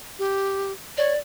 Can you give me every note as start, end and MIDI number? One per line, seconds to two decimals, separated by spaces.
0.19 0.72 67
0.97 1.14 73
0.97 1.18 74